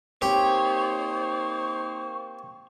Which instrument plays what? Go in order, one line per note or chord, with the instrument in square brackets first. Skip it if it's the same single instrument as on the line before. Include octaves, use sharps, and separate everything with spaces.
[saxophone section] A#3 D#4 C5 [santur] C4 [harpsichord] G4 [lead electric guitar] C#5